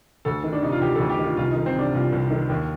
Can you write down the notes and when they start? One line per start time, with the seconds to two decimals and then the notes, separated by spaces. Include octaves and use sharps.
0.25 D2 A4
0.44 D#3
0.53 D4
0.63 C3 D#4
0.72 F4
0.81 D2 G4
0.95 D2 A4
1.10 G4
1.19 D#3 F4
1.37 C2 F4
1.51 D#3 D#4
1.66 C4
1.75 C3 D4
1.93 C2 F4
2.12 C2
2.30 D#3
2.49 D#2